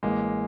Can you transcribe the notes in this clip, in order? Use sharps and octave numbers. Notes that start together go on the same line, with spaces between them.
A1 G#3 A#3